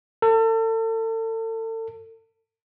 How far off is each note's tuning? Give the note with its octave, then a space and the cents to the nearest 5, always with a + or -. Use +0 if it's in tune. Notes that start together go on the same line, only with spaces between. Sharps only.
A4 +35